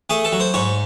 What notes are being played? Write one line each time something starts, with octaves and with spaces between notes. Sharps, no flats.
A3 G#4
A4
F#3
C5
G#2 C#5